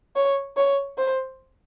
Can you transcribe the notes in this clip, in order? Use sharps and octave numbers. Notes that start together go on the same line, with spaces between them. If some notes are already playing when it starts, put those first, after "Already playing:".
C#5
C#5
C5